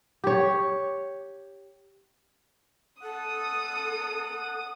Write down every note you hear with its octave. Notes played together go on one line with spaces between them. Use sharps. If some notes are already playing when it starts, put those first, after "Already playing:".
G4 C#5
A4 F#5 D#6